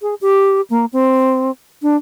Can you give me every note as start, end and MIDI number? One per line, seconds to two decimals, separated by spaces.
0.02 0.14 68
0.21 0.61 67
0.70 0.85 58
0.93 1.51 60
1.82 1.96 62